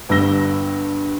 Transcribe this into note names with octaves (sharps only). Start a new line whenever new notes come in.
G1 G2 G3 E6 A#6 G7